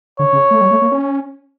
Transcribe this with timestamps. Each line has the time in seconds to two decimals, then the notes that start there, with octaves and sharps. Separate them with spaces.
0.19 D3 C#5
0.33 C#3
0.51 A3
0.61 G3
0.71 A3
0.82 A#3
0.92 C#4